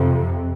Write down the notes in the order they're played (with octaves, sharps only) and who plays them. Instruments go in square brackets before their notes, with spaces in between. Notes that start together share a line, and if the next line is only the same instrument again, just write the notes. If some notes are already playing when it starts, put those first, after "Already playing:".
Already playing: [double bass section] F2 C3